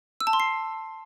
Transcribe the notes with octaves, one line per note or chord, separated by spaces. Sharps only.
E6
A5
C6
C7